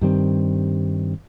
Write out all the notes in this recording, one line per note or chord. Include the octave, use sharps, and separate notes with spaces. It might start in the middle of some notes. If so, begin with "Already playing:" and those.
G2 D#3 G3 C4